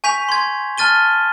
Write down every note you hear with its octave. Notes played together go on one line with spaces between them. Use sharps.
G#5 C#6 G6 B6 F7
C6 G#6
A5 F6 A6 D#7 G7